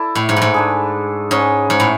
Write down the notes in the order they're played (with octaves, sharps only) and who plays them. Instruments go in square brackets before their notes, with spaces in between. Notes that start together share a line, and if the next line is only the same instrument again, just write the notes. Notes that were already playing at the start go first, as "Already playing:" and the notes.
Already playing: [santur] E4 A4 D5
[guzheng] A2
G#2
A2
G#2
[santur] A3 D4 G#4
[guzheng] G#2 [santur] C#4 G#4 C#5
[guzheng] G#2
A2